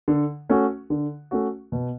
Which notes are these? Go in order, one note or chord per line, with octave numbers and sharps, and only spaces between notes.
D3
A3 C#4 F#4
D3
A3 C#4 F#4
B2